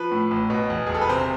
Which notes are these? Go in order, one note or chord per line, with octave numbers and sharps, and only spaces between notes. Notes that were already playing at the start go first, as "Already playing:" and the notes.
Already playing: F3 B4
A2
A1
B2
E2
E1 G#4
A4
B4
C3 C5